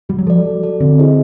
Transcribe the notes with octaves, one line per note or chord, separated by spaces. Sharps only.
G3 F#4
F#3
F3 A4 D5
F#4
A4 D5
D3 C4
E4 G#4 C5 D#5